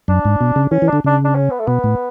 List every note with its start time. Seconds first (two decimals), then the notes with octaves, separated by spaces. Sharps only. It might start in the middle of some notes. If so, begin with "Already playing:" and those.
0.08 F#2 D4
0.25 G#2
0.41 B2
0.56 C#3
0.71 E3 C#4
0.82 E3
0.88 D3 D4
1.04 C#3 D4
1.25 D4
1.35 C#4
1.51 B3
1.60 A3
1.67 B2 B3
1.84 A2